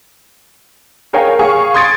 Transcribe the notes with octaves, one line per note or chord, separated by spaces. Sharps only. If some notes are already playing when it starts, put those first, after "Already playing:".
G#4 A#4 C#5 F5 G5 G#5
G#4 F5 G#5 C#6
C6 D#6 G#6 A6 C#7 D7